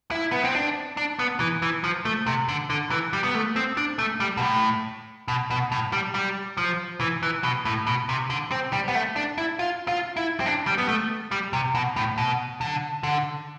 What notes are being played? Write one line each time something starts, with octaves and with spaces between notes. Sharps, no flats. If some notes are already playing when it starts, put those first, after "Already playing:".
E4
B3
C4
D4
D4
B3
E3
E3
F3
A3
C3
D3
D3
E3
G3
B3
A3
C4
D4
A3
G3
B2
A2
B2
B2
A2
G3
G3
F3
E3
E3
B2
A2
B2
C3
D3
C4
G3
B3
A3
D4
E4
F4
F4
E4
C4
D4
G3
B3
A3
G3
C3
B2
A2
B2
D3
D3